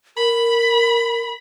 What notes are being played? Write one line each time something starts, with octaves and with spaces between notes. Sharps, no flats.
A#4 B5